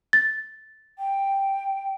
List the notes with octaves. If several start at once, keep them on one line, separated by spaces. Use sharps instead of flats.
A6
G5